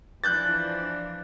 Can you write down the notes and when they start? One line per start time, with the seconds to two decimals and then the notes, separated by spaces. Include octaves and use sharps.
0.24 E3 F3 D4 F#6 G6 A6